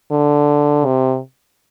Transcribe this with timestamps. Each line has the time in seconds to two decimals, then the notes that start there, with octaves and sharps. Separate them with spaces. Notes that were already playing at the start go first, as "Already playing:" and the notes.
0.11 D3
0.85 C3